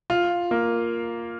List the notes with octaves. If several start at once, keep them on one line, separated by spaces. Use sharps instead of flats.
F4
A#3